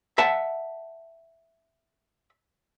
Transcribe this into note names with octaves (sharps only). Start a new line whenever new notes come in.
E5 F#5 A5